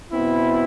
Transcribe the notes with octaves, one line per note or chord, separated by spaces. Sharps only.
B2 B3 C4 E4